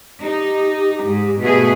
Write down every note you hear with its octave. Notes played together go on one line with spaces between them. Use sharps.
D#4 G4
G#2
B2 A3 G#4